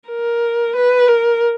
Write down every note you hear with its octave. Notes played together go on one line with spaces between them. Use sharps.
A#4
B4
A#4